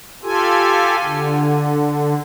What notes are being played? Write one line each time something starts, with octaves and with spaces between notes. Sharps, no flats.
F4 G4 A4 G#5
D3